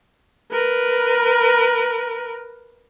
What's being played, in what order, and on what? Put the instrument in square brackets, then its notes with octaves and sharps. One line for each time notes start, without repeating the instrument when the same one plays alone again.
[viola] A#4 B4